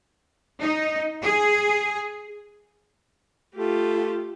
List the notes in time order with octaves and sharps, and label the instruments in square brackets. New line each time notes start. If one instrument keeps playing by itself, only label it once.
[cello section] D#4
G#4
[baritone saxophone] A3 [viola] F4 G4